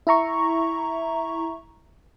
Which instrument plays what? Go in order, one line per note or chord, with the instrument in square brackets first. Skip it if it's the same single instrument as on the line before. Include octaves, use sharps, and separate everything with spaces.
[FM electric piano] E4 E5 A#5 C#6